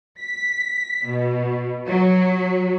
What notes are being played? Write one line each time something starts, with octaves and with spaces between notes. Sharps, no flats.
B6
B2
F#3